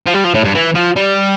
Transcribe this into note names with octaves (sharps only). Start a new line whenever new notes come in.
F3
G3
F3
A2
G2
E3
F3
G3